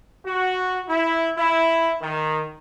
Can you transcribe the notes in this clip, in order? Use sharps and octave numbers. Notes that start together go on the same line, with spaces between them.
F#4
E4
E4
D#3